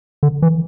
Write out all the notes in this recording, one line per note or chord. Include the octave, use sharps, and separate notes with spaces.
D3
E3